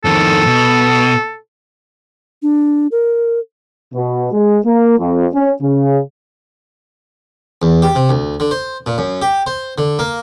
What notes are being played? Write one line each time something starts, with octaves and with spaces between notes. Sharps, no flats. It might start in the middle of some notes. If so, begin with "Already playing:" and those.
F2 D#3 A4
B2
D4
A#4
B2
G#3
A#3
F2
C#4
C#3
E2
G4
C3
D2
D3
C5
A#2
F#2
G4
C5
D3
A#3